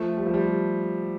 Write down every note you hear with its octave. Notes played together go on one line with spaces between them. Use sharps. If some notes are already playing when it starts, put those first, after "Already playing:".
Already playing: F3 A3
G3
F3
G3